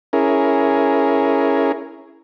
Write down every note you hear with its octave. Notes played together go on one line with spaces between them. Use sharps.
C#4 E4 G#4 A#4